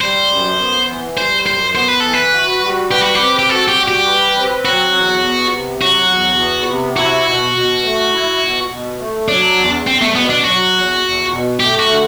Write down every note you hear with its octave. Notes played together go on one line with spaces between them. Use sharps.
G3 C5
F#2
B3
E3
G3 C5
F#2 C5
B3 C5
B4
E3 A4
B4
F#4
G3
G4 B4
F#4
C4 G4
G4
F#4 A4
G4
G3
G4
B4
C4
F#3 F#4
E2
B3
C3
F#3 F#4
E2
B3
C3
E4 F#4
B2
B2
A3
E4
B2
B2
A3
F#3 D4
E2
E2 C4
A3
B2 B3
D4
F#3 F#4
E2
E2
B2
A3 G4
F#4
D3